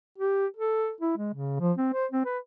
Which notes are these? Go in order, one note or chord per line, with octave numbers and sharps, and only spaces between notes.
G4
A4
E4
G#3
C#3
F3
C4
C5
C4
B4